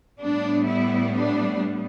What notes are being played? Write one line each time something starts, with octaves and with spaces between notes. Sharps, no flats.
A2 G3 B3 D4
E4
D4